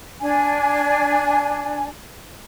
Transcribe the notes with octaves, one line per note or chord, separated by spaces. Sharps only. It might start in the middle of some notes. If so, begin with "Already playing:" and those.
D4 G#5